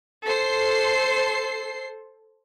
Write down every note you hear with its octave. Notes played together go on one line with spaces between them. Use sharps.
A4 C5 C7